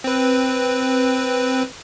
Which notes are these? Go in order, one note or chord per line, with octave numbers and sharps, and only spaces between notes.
C4 B4